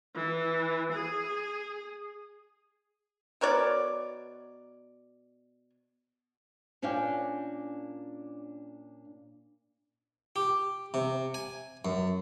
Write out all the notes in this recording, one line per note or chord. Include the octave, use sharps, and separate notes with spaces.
E3
G#4
B2 A#4 C#5 D5
A#2 C#4 D4 D5 F5 G5
G4
C3
G#5
F#2